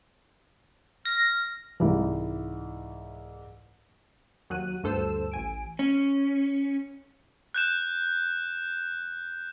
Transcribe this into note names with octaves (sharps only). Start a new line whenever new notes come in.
F6 A#6
C2 G#2 E3
D#2 F#3 F#6 D#7
D2 G2 A4 C5 E6 E7
A1 G#5 D7
C#4
F#6 G6 E7